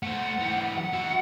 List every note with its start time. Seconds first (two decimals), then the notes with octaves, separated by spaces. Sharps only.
0.03 A3 C5 F#5
0.39 E3 G4
0.78 F#5
0.93 F#4 E5